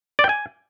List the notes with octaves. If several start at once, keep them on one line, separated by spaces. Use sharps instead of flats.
D5
G5
G#5